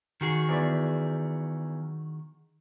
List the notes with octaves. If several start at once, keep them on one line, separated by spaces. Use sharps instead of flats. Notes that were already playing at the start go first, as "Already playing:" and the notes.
D#3 F#4 G#4
E2 D5 B5